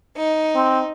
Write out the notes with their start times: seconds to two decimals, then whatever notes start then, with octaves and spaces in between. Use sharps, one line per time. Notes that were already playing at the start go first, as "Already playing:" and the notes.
0.16 D#4
0.55 C4